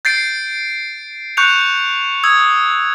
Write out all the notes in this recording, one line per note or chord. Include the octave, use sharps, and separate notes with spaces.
G6 A6 C7 D7
C#6 F#6 G6 C#7 F7
D#6 E6 G#6